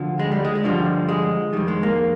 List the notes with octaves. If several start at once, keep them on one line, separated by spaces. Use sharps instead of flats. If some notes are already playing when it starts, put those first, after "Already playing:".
Already playing: D2 D3 F3
G#3
G3
G#3
G#3
G2 D3 F3 G3
G#3
F2 D#3 G3
G#3
A#3